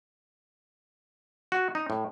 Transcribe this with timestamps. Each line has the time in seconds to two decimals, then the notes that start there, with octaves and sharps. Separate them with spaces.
1.52 F#4
1.75 D#4
1.90 A2